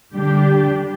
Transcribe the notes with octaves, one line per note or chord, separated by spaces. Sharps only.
D3 G3 D4 G4